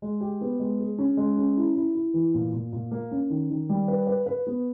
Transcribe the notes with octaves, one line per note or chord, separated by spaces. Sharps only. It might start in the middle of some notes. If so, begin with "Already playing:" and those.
G#3
G4
B3
G#3
G#4
C#4
G#3
C#4
E4
E4
E4
E3
A#2
A#2
A#2
A#3
C#4
D#3
D#3
G3
B4
B4
B4
B3